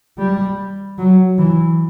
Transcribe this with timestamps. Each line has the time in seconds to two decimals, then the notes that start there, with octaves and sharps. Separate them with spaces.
0.18 G3
0.99 F#3
1.39 E3